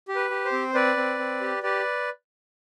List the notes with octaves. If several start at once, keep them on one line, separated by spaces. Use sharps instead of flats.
G4
B4
G4
C5
C4
C4 B4 D5
C4
C4
G4
G4 B4 D5